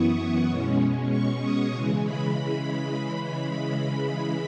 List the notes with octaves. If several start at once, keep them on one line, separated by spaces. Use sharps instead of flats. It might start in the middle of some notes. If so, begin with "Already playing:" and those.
Already playing: F#2 E3 B3 E4 C#6 D#6
C#6
B2 G#3 C#4
C#6
D#6
C#3 E3 G#3
B5
B5